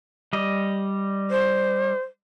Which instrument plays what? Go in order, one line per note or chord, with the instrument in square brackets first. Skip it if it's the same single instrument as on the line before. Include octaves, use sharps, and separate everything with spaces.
[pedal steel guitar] G3 D#5
[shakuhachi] C5